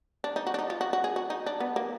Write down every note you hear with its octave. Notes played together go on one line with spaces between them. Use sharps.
D4
D#4
F#4
D4
D#4
F4
F#4
F#4
G#4
F#4
D#4
D4
B3
A#3